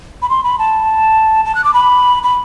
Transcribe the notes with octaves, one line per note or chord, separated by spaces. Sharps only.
B5
C6
B5
A5
A5
F#6
D6
B5
B5